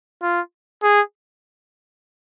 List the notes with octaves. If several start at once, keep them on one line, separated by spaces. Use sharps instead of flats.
F4
G#4